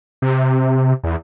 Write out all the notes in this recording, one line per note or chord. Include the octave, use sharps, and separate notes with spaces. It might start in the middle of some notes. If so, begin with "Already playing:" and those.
C3
E2